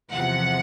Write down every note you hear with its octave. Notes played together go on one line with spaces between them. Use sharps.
E2 C3 F3 F#5